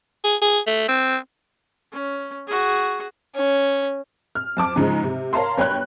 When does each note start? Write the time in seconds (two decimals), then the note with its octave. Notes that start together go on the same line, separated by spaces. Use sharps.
0.24 G#4
0.42 G#4
0.67 A3
0.88 C4
1.92 C#4
2.47 F#4 G#4
3.35 C#4
4.35 F6
4.57 F2 A5 D6
4.76 G#2 C#3 F3 G#3
5.03 C3
5.33 A#4 C#5 F5 A5 A#5 C6
5.58 G1 C#5 G5 B5 F#6